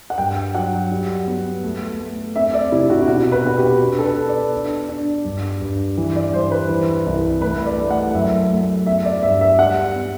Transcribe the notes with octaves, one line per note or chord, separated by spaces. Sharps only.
F#5
G2 G5
F#3 F#5
G3
B3
A3
A3
C4 E5
D5
C3 E4
F#4
E4
B2 F#4
B4
B2 F#4
G4
D4
A4
B4
B3
D5
D4
D4
G2
G2
E3
D5
G2 C5
B4
E3
C2
A3 B4
D5
A3
F#5
F#2 E5
A3
B3 E5
D5
G2 E5
E5
G3 F#5
B3